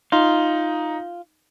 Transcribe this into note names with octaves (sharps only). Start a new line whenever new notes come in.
D#4 F4